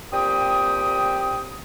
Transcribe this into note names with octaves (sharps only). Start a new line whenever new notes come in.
A#2 C4 G4 G5 D#6